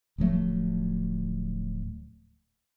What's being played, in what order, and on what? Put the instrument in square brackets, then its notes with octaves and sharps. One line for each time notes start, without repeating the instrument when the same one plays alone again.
[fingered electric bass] D1 F3 F#3 A3